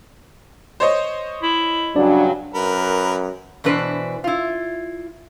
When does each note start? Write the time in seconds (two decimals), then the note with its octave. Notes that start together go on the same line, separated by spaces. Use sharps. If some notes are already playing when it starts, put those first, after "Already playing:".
0.80 C5 C#5 D#5
1.43 E4
1.96 G2 C#3 F#3 D4 D5
2.54 F#2 A#4 B4 B5
3.64 B2 E3 D4 B4 C5
4.24 E4 F4